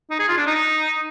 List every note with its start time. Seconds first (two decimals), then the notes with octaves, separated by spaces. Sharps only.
0.10 D#4
0.19 G#4
0.28 F4
0.37 D4
0.46 D#4